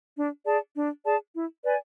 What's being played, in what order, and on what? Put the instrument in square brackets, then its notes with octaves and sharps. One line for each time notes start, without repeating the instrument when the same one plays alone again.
[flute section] D4
G#4 D5 A5
D4
G#4 D5 A5
E4
B4 D5 G#5